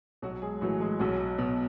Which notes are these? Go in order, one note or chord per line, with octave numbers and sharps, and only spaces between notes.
B1 F#3 F#4
G#3 G#4
A2 E3 F#3 F#4
G#3 G#4
B1 F#3 F#4
B2